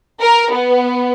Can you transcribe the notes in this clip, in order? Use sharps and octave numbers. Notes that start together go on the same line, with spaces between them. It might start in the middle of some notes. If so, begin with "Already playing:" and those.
A#4
B3